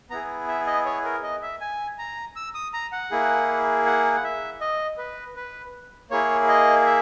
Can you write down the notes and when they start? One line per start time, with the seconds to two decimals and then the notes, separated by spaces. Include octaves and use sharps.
0.10 B3 E4 G#4 A#5
0.48 E5
0.67 D#5
0.85 C#5
1.05 A#4
1.23 D#5
1.42 E5
1.61 G#5
1.99 A#5
2.36 E6
2.55 D#6
2.73 A#5
2.92 F#5
3.11 A#3 E4 G#4
3.86 F#5
4.16 F#5
4.24 E5
4.61 D#5
4.98 B4
5.36 B4
6.10 A#3 E4 G#4 C#5
6.49 D#5
6.85 E5